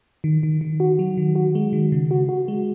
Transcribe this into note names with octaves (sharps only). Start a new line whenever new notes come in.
D#3
D#3
D#3
F#4
F#3
D#3
F#4
G#3
D#3
C#3
F#4
F#4
G#3